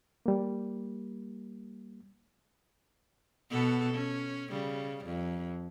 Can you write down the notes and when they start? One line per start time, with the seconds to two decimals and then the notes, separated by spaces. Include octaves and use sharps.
0.26 G3 A#3
3.50 B2 B3 A4
3.93 C#4
4.50 C#3 G3
5.06 F2